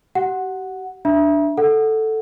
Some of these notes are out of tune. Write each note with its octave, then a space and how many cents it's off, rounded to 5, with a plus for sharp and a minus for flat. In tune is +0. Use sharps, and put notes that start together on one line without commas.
G4 -40 F#5 +0
D4 +0 E5 +5 A#5 +40
A4 +0 F#5 +0